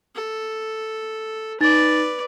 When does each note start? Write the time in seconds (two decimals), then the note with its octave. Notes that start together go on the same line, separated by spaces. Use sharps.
0.15 A4
1.61 D#4 B4 D5 A6